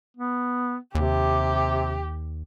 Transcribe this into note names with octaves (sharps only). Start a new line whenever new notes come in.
B3
D#2 C3 G4